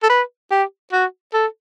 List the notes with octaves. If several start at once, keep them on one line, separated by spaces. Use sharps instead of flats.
A4
B4
G4
F#4
A4